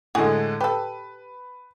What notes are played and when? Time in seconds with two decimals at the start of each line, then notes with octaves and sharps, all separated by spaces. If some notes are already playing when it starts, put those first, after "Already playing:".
0.15 A2 D3 G#3 F#4 G#4
0.61 G4 A4 B4